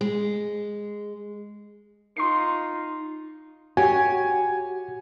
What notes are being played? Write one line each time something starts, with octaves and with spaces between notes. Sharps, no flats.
G#3
D#4 F4 C6 C7
F#4 G4 C#5 G#5